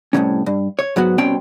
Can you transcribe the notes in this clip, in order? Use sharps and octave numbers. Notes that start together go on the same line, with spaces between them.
C2 A2 C3 C#4
G2
C#5
G#2 F#3 B3 F#4
C2 B2 C4 C#4 G5 C6